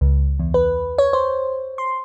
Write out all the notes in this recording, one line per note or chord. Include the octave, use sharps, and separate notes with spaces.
C#2
E2
B4
C#5
C5
C6